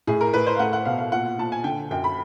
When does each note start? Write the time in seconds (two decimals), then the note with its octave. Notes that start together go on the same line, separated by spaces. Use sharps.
0.07 A2 G#4
0.21 A#4
0.34 A2 B4
0.47 C5
0.55 F5
0.59 A3 F#5
0.73 F#5
0.85 B2 F5
0.98 F5
1.12 A#2 F#5
1.38 A#2 A5
1.52 G#5
1.64 D3 G5
1.91 F#2 G5
2.04 B5